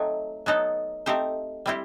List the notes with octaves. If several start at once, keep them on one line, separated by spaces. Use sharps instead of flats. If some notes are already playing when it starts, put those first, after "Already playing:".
Already playing: F#3 A3 C4 D#4
F#3 B3 D#4 A4
A3 C4 D#4 G4 C5
G3 C4 E4 G4